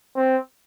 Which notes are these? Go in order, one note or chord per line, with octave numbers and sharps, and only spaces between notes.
C4